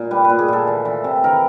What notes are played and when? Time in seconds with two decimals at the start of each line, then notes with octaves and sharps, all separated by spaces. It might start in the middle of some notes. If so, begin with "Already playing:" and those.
Already playing: A#2
0.11 G3 B4
0.25 B4
0.30 A#2
0.39 G#4
0.48 A#2 A4
0.67 E3
0.85 E3
1.04 C3
1.24 E3 A#4